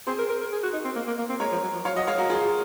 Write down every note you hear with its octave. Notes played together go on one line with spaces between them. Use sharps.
C4 G#4 C5
A#4
A#4
A#4
G#4
F#4
D#4
C4
A#3
A#3
A#3
C4
G#3 A#4 C#5
F3
F#3
F3
F#3 C#5 F5
F#3 D#5 F#5
G#3 C#5 F5
F#3 F#4 A#4
F3 F4 G#4